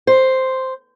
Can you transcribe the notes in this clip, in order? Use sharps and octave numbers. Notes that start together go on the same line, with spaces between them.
C5